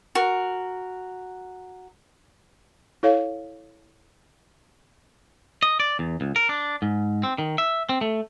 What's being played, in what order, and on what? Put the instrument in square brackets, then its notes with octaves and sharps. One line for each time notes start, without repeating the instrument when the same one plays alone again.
[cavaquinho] F#4 A#4
[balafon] E4 A4 C#5 F5
[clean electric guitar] D#5
D5
E2
C#2
A#4
D4
G#2
C4
D#3
E5
C4
A3